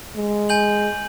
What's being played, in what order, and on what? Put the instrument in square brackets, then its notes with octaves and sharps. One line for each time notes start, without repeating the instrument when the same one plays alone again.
[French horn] G#3
[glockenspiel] G#5 G6 F#7